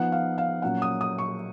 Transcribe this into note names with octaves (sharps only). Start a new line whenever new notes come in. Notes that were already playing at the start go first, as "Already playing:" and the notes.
Already playing: F3 B3 D#4 F#5
F5
F5
A#2 F#3 C#4 F#5
D#6
D#6
C#6